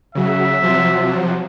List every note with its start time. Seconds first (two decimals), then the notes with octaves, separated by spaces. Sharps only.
0.15 C#3 F#3 E5
0.62 C3 F3 F#3